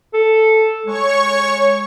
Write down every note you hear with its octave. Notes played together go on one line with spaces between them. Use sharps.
A4
G#3 C#5 C#6